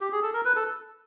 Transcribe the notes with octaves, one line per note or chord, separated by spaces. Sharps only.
G4
G#4
A4
A#4
B4
A4